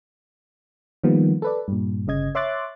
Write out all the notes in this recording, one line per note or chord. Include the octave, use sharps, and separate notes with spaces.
D#3 F3 G3 A#3 B3
A4 B4 D5
G2 A#2
G1 C#3 D#5 G#6
C#5 E5 C6 D6 F#6 A6